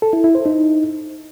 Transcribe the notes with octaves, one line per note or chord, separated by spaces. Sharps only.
A4
E4
E4
C5
D#4